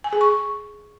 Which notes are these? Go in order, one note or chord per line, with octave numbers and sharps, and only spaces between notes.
G#5
G#4
C#6